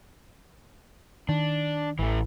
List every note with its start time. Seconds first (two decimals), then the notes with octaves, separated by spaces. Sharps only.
1.29 D#3 D4
1.99 A1 E3 A3